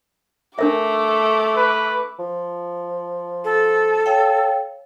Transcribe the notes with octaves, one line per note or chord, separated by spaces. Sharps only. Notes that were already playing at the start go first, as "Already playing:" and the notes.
A3 D4 A#4 E5 D6
B4
F3
A4
C#5 F5 G5